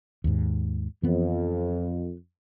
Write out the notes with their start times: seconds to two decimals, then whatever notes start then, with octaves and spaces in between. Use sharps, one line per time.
0.24 D#2 G#2
1.03 F2 E3 B3